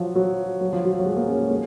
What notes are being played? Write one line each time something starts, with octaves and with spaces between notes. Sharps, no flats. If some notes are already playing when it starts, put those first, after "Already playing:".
Already playing: F3 F#3
F#3
F#3
F3
F#3
F#3
G#3
A#3
C#4
A#3
G#3